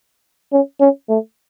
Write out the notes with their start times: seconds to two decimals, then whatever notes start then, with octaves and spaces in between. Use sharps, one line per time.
0.52 C#4
0.80 C#4
1.09 A3